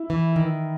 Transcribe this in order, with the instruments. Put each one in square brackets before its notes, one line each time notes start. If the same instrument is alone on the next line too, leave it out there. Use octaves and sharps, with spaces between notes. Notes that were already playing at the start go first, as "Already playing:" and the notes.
Already playing: [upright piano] E4
[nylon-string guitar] E3
D#3